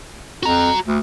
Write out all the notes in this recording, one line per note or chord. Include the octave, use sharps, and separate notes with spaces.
F2 F#4 A#5
D2